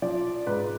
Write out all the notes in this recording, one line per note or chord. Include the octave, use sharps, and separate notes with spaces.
F3 D5
G#2 B4